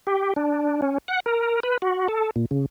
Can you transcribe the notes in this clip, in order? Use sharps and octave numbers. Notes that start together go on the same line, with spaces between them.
G4
D4
C#4
F#5
A#4
B4
F#4
A4
A#2
C#3